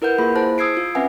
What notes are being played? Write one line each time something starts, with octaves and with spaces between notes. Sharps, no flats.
E4 A#4 B4 F#5 G6
A#3 F4 G#4 B5
E4 G#4 C5 A5 F#6
D#6 E6 G#6 C7 D7
F4
C4 C#4 B4 E5 F#5 G#5